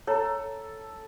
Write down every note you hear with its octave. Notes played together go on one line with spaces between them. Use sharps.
A4 C#5 A#5